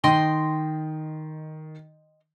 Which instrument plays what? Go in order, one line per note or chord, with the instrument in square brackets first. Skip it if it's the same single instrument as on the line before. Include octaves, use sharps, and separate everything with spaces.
[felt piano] D#3 [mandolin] D#5 G5 C6